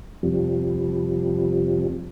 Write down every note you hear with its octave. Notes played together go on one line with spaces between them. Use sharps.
F2 C3 F3 G3